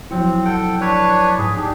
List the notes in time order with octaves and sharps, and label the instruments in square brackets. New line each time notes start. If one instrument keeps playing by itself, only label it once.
[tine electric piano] F3 F#3 E4 [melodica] C4
[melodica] A4 F#5 G5
D4 B4 C#5
[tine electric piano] G#2 [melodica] G#4
[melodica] D4 G4 [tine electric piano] D#4